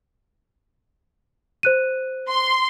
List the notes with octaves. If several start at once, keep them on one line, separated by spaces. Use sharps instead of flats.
C5 F#6 D#7
C6